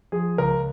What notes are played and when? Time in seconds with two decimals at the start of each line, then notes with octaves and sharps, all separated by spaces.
0.12 F3 G#4
0.38 C#2 A#4